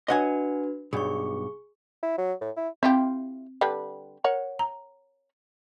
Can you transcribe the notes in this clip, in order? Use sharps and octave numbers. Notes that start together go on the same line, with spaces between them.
D4 F#4 B4 D#5 F#5 G#5
B1 G2 G#4 C#6
E4
F#3
A2
E4
C4 E4 F4 G4
D3 G3 B4
A#4 C#5 F#5
A#5